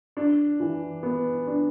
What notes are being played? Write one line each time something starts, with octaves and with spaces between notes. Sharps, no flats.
D4
E3
B3
D4